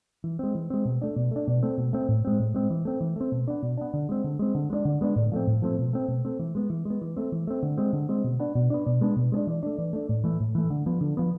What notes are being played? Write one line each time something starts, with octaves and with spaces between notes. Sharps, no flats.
E3
G#3 C4
E3
G#3 C4
B2
A3 D4
B2
A3 D4
B2
A3 C4
B2
A3 C4
A2
G#3 C4
A2
G#3 C4
E3
A3 C4
E3
A3 C4
B2
B3 D4
B2
B3 D4
D3
G#3 C4
D3
G#3 C4
D3
G#3 B3 D4
D3
G#3 B3 D4
A2
F3 A3 C4
A2
F3 A3 C4
B2
A3 C4
B2
A3 C4
E3
G#3 B3
E3
G#3
B3
E3
A3 C4
E3
A3 C4
D3
G#3 C4
D3
G#3 C4
B2
B3 D4
B2
B3 D4
B2
G#3 B3 D4
B2
G#3 B3 D4
E3
A3 D4
E3
A3 D4
A2
E3 A3
A2
E3 A3
D3
F3 B3
D3
F3 B3